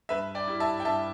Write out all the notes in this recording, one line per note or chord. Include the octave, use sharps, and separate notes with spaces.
G2 B4 E5
D5 G5
G3 E4
E5 A5
G5
G2 E5 A5